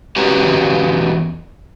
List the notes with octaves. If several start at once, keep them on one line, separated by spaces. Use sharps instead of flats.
E2 C#4 F#4 G4 B4 A#5